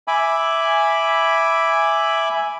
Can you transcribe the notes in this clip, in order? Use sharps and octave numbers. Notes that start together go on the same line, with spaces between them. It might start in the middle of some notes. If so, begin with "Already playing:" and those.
E5 G#5 B5 D6